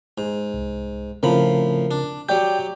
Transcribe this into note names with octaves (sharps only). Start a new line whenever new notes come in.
G#2
C2
A2 C#3 F3 C4 A#4 B5
D4
F#3 G4 D5 G5 G6